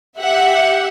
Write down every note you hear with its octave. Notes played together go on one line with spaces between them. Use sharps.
G4 E5 F#5